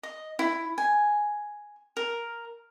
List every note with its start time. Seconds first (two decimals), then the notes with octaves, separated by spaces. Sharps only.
0.03 D#5
0.39 E4
0.78 G#5
1.97 A#4